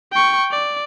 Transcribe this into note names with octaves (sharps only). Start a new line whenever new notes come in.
G5 C#6
D5